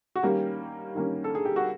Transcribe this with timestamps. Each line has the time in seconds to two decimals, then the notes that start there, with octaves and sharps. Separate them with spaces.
0.16 F#4
0.23 D#3 G3 A#3 C#4 G4
0.95 D#3 G3 A#3 C#4
1.24 A4
1.35 G#4
1.45 G4
1.56 F#4